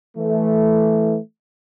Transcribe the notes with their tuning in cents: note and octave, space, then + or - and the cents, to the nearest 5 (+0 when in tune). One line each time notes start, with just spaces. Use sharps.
E3 +0 A3 -5